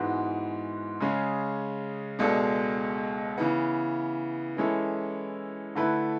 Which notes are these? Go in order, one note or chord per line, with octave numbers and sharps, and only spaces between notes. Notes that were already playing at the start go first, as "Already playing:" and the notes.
Already playing: G#2 E3 G#3 B3 F#4
C#3 G#3 C#4 G#4
C#2 B2 G#3 D4 A4
C#3 E3 B3
E3 G#3 C#4 E4 A4
D3 A3 E4 B4